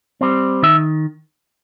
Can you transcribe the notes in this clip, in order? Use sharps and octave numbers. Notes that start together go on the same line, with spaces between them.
G3 C4
D#3 E5